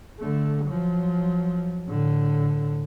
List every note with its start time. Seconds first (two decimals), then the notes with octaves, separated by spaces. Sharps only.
0.20 D3 A3
0.66 F3 F#3
1.87 A2 D3